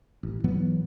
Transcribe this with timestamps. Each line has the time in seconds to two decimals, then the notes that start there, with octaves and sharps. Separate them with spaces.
0.23 A1
0.44 G#2 E3 F#3 B3